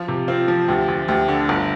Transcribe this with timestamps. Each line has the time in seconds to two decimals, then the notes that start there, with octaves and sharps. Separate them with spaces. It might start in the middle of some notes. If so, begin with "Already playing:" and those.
Already playing: F3 F4
0.08 C3
0.28 C4 F4
0.48 F3
0.68 D2 G4
0.88 D2
1.08 D2 G4
1.28 D3
1.49 G1